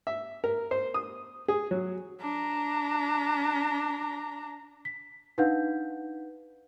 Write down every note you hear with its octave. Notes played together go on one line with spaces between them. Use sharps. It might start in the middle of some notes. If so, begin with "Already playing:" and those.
E5
A#4
C5
D#6
G#4
F#3
D4 A#5
B6
D4 D#4 B4 F5 F#5 G6